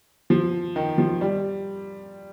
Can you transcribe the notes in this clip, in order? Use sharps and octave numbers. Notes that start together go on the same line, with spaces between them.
F3
D#3
F3
G3